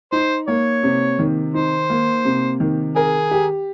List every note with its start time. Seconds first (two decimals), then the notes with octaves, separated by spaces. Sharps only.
0.12 D#4 C5
0.48 A#3 C#5
0.83 C3
1.19 D#3
1.54 D#4 C5
1.90 A#3
2.25 C3
2.60 D#3
2.96 G#4 A#4
3.31 G4